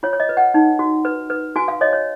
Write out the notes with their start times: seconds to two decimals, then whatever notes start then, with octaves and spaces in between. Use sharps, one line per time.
0.03 F4 C#5
0.13 C#5
0.20 D#5
0.29 B4
0.37 F#5
0.54 D#4
0.79 F#4
1.05 B4
1.30 B4
1.56 F#4 G#5
1.68 F5
1.81 C#5 D#5
1.93 C#5